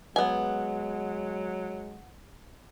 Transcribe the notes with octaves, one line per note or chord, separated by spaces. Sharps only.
F#3 G#3 B3 G#5